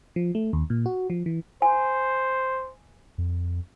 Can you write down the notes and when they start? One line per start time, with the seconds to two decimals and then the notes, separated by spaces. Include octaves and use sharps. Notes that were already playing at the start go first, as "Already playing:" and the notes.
0.16 F3
0.35 A3
0.53 D#2
0.70 A#2
0.86 F#4
1.10 F3
1.26 E3
1.62 C5 G#5
3.18 F2